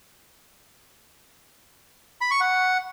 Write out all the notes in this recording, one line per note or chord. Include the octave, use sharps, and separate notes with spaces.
B5
C#6
F#5